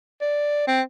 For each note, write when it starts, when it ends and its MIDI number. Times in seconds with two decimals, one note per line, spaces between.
0.21 0.64 74
0.67 0.81 60